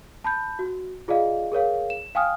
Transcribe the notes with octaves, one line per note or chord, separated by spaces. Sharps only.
A5 B5 G6
F#4
F4 G#4 D5 D#5 F5
G#4 A#4 C#5 F5
E7
F5 G5 G#5 D#6 F6